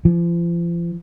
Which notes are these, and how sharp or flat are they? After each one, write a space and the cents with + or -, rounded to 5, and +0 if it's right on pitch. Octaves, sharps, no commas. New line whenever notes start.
F3 -40